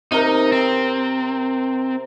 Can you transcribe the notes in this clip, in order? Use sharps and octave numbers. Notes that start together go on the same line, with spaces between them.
C3 D#4 A#4
C4